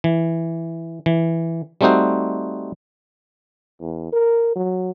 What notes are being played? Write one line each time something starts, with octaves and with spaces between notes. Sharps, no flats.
E3
E3
G3 A3 C4 D#4 F#4 C5
E2
A#4
F#3